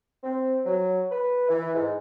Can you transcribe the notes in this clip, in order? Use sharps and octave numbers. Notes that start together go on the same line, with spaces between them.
C4
F#3
B4
E3
G#2